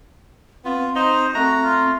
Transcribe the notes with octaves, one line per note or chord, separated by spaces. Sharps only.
B3 C4 F4
D#4 C5 D#5
A3 F#4 A#5
F4